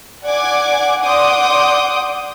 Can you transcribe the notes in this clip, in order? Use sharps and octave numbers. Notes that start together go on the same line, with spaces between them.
D5 F#5 G#5 D6 G#6
D5 F#5 C6 D6 D#6 G6